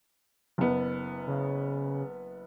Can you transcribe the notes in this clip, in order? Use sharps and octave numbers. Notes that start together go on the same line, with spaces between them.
F#1 B3
C#3